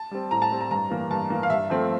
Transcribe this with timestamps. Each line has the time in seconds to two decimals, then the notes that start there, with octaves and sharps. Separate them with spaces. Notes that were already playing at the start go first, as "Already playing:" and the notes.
Already playing: A5
0.11 G3 C4
0.31 A2 A#5
0.42 A5
0.51 G3 C4
0.61 A#5
0.71 G2 A#5
0.90 E3 A#3
1.10 G2 A5
1.30 E3 A#3
1.43 F5
1.50 G2 E5
1.70 F3 A3 C4